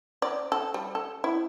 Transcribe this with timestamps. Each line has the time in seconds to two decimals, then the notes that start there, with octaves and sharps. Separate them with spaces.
0.22 D5
0.52 A4
0.74 G3
0.95 A4
1.24 E4